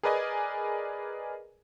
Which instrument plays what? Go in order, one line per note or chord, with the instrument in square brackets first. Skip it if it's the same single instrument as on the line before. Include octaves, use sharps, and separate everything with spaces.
[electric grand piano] G#4 A#4 B4 D5 D#5 G#5